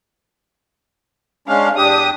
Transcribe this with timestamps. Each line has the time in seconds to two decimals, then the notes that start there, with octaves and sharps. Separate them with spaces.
1.48 G#3 C#4 D4 F5
1.77 E2 D4 G4 D#6